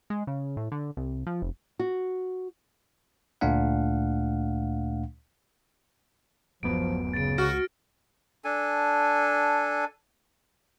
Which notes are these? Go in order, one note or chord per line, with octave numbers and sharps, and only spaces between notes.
G#3
C#3
A2
D3
C2
F3
F1
F#4
D2 A#2 A3 D4 F5 F#5
D1 F#2 F3 B3 D7
C#3 A6 D7
C#2 F#4 F6 A#6
D4 A4 G#5